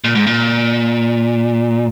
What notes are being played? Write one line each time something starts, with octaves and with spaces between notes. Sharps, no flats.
A#2
G#2
A#2